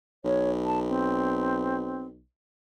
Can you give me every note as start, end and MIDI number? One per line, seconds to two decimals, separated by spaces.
0.25 2.24 35
0.25 0.50 73
0.66 0.79 81
0.88 2.06 60